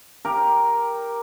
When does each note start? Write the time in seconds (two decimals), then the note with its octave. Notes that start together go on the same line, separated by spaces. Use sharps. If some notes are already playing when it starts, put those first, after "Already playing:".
0.25 G4 A#4